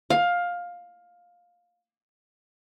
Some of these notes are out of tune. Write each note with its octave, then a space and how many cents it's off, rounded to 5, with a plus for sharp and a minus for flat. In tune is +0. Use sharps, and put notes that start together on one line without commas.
F5 +15